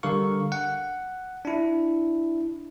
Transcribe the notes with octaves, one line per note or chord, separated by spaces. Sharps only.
D3 G3 A#4 F5 C#6
F#5
D4 E4